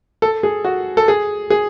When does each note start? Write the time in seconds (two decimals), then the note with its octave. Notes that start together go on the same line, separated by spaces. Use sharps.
0.22 A4
0.43 G#4
0.65 F#4
0.97 A4
1.08 G#4
1.50 G#4